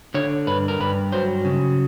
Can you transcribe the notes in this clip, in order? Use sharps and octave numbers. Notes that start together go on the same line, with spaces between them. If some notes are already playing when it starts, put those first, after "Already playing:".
D3 C#5
G2 B4
A#4
G2 B4
F#3 C5
C#3